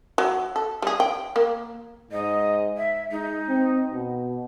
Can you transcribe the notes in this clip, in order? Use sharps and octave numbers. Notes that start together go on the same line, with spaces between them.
F#3
A4
G3 G#4
G5
A#3
G#2 D#5
E5
G#3 D#4
C4
B2